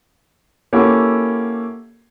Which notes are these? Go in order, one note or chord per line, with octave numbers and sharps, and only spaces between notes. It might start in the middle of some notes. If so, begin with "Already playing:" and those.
A#3 C#4 E4 F#4 G4 A4